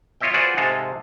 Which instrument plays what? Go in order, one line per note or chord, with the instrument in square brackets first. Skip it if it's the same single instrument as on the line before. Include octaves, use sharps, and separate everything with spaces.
[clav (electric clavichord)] F4 C#5 D#5 E5 G5
F4 F#4 G#4 B4 C5 D5
G#2 C3 G#3 A4 F5 G#5